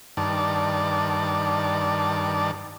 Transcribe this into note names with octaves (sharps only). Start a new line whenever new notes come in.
G2 D#3 D5 A5